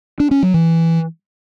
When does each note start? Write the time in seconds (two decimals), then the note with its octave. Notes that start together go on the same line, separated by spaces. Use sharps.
0.20 D4
0.31 C#4
0.43 F#3
0.54 E3